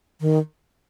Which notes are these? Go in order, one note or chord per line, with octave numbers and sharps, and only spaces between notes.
D#3